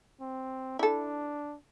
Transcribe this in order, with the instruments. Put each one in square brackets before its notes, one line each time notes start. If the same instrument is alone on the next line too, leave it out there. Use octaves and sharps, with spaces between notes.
[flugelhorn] C4
[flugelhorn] D4 [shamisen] E4 A4